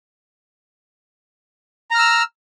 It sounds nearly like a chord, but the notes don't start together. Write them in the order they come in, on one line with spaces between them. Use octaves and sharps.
A#5 F6 E6